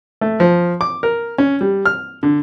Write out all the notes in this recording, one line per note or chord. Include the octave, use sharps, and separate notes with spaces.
A3
F3
D6
A#4
C#4
G3
F6
D3